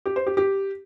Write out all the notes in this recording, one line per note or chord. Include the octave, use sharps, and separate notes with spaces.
G4
C5
G4
G4